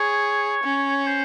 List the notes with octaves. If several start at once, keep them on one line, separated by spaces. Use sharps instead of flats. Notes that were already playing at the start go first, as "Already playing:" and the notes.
Already playing: G#4 C#5
C#4
C5